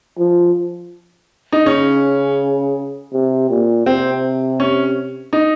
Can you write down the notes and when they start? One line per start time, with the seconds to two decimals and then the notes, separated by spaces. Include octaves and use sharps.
0.18 F3
1.53 D#4
1.66 C#3 C#4
3.13 C3
3.50 A#2
3.86 C3 C4
4.60 C#4
5.33 D#4